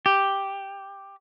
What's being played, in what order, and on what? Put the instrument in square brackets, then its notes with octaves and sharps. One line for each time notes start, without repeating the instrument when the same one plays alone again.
[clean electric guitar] G4